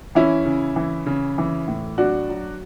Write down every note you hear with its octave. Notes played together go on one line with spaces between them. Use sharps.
E3 C#4 E4
C#3
E3
C#3
E3
A2
F#3 D4 F#4
F#3